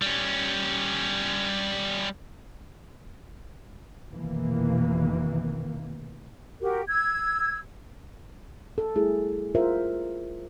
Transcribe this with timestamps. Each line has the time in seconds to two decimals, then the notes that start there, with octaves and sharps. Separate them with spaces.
0.02 G3 C#4
4.10 F1 B2 D#3 E3 A#3
6.61 F#4 G4 A#4
6.88 E6 G#6
8.78 A4
8.95 G3 A3 E4 G#4
9.55 F4 A#4 C5 E5